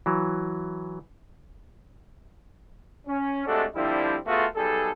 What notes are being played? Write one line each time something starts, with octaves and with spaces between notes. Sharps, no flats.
E3 F#3
C#4
C3 G#3 A3 D4 F#4 A4
D3 F3 G3 C4 E4
A3 B3 F4 F#4 G#4 A4
B1 G3 G#4 A4